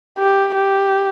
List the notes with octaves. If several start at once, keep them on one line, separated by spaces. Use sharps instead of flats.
G4
G4